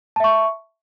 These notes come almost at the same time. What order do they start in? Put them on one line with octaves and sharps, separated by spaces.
A5 E5 C#6